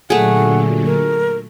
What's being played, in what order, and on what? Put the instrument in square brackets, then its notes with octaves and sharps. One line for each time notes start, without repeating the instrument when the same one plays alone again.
[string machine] A#2 D3 F#3 [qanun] A3 G#4 [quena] F#5
[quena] A#4